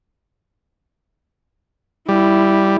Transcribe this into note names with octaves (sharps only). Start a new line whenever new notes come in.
G3 E4